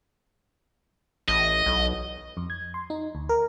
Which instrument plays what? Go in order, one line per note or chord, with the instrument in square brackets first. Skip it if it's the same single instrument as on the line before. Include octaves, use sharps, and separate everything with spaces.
[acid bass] A1 [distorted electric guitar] D#5
[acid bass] B1
[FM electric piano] F2
G#6
C6
D#4
D2
A#4